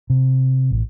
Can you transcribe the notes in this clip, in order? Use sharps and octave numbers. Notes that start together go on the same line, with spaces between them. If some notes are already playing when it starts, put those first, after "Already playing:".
C3
A1